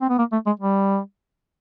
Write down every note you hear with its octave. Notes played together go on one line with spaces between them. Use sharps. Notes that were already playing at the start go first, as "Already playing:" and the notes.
C4
B3
A#3
A3
G#3
G3